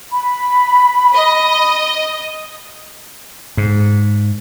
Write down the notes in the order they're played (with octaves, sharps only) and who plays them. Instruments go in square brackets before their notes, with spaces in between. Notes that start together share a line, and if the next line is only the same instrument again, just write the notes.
[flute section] B5
[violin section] D#5
[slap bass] G#2